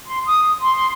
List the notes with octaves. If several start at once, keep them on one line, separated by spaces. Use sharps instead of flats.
C6
D#6
C6